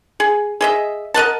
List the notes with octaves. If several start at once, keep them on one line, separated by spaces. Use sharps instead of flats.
G#4
G#4 D#5 E5
A#4 D#5 F#5 A5